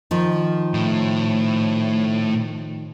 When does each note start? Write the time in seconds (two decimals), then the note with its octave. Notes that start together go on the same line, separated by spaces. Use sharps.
0.11 D#3 F3
0.74 A2